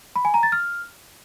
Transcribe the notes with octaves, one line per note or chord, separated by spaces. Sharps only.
B5
G#5
A#5
A6
F6